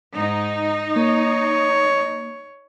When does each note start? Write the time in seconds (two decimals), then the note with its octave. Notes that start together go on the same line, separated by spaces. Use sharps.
0.15 G#2 D#4
0.96 A#3 C#5